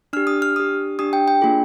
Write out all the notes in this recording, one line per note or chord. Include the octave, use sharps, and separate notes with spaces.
D4 G4 F6
D#6
F6
D4 G4 D#6
D4 G4 D#6
G5
G5
A#3 D4 F4 G#4